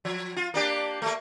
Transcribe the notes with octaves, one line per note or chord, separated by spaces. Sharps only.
F3
F4
A#3 D4 G4
A3 A#3